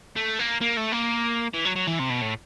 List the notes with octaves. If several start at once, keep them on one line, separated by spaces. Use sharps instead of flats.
A3
A#3
A#3
A3
A#3
E3
F#3
F#3
E3
C3
B2
A2